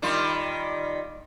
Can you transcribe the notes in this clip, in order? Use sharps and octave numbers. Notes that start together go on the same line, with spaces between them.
D#3 G3 F4